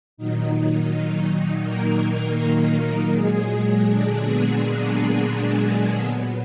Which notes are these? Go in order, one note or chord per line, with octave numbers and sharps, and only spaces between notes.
A#2 D#3 F#3 D#4
D#3 D#4
A#3 A#4
A#2 F#3 G#3 G#4
D3 D4
B3
A#3
B3
A#2 F#3